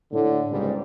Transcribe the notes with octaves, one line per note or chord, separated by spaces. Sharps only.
A2 D3
G1 C#2 G#2 G3